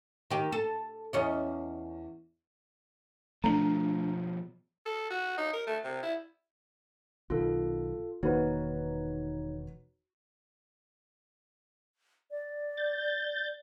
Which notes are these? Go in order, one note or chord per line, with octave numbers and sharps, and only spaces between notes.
D#3 G4
A4
E2 C#4 D#5
B2 F3 A3 B3 D4 A#5
A4
F#4
D#4
A#4
A3
C3
E4
B1 B2 D#3 F4 A4
E1 D#3 A#3 D#4 F#4 B4 C#5
D5
G6 A6